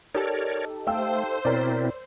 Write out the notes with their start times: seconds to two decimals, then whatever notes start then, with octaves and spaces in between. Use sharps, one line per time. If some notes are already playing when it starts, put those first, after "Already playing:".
0.15 D#4 G4 A4 A#4 C#5 D5
0.87 A3 C5 F5 G5 E6
1.45 B2 C4 E4 A#4 C#5 D5